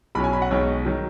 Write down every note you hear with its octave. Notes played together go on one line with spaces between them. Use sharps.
B1 B2 F#3 C#4 B5
G#5
B5
F#5
B1 B2 G#3 D#4 C#5
D#3 F#3